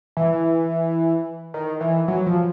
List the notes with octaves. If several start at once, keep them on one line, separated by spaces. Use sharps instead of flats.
E3
D#3
E3
F#3
F3